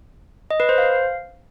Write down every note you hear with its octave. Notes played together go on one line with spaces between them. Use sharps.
D#5
B4
C5
F5